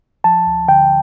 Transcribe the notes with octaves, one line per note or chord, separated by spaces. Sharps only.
F3 A5
D2
D3 G5